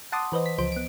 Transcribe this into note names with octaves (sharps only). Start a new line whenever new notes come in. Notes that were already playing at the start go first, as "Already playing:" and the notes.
F#5 A5 C6 D6 D#6
E3 B4 C5 D#5
B6
C#2 F3 C5 D7
B3 D7